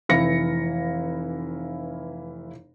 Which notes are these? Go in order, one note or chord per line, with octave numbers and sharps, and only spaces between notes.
F1 E3 E4 F5 A#6 C#7